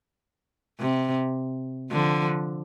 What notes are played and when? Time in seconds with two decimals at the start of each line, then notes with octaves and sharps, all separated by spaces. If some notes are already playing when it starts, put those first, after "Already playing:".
0.80 C3
1.91 D3 F3